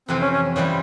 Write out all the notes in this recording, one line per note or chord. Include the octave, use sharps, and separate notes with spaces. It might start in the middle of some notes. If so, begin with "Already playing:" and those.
F2 C3 E3 C4
C#4
C#4
C#3 E3 G3 C4